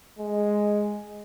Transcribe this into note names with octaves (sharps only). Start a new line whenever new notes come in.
G#3